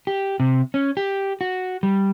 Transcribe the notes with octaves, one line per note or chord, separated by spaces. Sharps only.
G4
C3
C#4
G4
F#4
G3